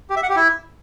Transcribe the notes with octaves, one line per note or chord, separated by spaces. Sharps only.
G4
E5
F#5
G4
E4